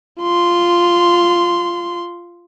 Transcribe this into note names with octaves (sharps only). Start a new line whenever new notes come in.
F4 C6